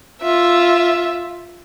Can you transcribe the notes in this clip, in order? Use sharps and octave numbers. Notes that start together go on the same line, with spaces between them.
F4 E5